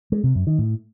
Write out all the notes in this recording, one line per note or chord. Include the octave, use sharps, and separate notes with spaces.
G#3
C3
F#2
D#3
A2